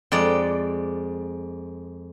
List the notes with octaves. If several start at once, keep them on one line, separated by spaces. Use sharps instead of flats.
F2 G#3 D5